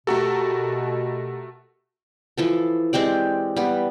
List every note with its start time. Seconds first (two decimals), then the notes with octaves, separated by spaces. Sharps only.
0.07 B2 A3 F#4 G4 A4 A#4
2.38 E3 F3 A4
2.93 G#3 C4 G4 D5
3.56 G3 B3